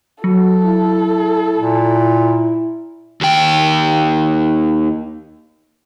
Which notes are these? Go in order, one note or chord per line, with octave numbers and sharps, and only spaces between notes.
F#3 F#4 A4
E4
A#2
D#2 G5